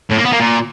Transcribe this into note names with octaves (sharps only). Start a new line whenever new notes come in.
A2
A#3
B3
A#3
A#2